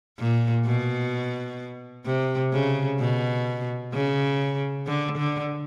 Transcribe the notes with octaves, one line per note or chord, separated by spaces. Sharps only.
A#2
B2
C3
C#3
B2
C#3
D3
D3